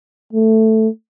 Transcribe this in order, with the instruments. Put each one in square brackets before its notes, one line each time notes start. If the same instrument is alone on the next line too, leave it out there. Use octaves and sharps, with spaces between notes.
[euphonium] A3